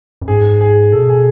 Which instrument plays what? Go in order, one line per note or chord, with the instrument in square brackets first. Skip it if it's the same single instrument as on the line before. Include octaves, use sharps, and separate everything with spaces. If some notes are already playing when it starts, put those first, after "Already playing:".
[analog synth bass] F#2
[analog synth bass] G#2 [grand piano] G#4
[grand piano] G#4
[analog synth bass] B2 [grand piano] A4
[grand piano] G#4